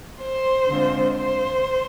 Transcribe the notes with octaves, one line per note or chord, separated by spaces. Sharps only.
C5
D3 G#3 C4 F4
C5